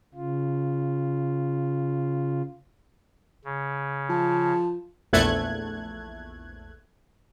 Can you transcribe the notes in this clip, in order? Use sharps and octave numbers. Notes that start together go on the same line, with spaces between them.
C#3 F4
C#3
F3 A5
A#1 E2 A3 A4 F#6 G#6